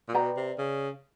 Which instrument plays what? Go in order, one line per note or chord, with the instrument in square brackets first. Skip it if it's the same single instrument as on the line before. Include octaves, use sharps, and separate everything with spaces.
[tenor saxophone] A#2
[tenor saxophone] B2 [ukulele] B4 D5 G5 A#5
[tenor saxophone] C3
C#3